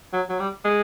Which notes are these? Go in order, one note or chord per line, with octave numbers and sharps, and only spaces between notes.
F#3
F#3
G3
G#3